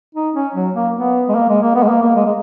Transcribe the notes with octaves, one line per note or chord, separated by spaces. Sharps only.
D#4
C#4
F#3
A#3
B3
G#3
A#3
G#3
A#3
B3
G#3
A#3
A#3
G#3
G#3